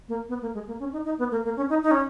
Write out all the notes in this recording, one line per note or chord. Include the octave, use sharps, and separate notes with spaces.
A#3
B3
A#3
G#3
A#3
C#4
D#4
D#4
B3
A#3
A#3
C#4
D#4
D#4
C#4